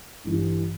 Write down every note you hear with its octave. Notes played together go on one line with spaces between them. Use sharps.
A1 G2 E3 G3